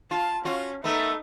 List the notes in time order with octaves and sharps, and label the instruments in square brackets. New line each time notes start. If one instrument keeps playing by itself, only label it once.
[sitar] F4 [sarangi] A5
[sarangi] C#4 [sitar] F4 F#4
[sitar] A3 B3 [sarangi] D#4 [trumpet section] A#4 E5